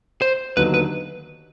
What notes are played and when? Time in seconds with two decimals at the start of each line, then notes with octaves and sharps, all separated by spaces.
0.22 C5
0.57 D#2 D3 F#3 B3 D#4 B4
0.74 B4